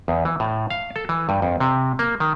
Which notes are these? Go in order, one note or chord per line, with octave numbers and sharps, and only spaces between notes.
E2
E3
A2
F5
A4
E3
G2
F2
C3
A#3
D#3